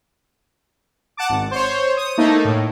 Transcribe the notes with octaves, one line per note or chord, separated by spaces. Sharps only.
F#5 A5 D6
G#1
C5 C#5
D#6
A3 A#3 D#4
A2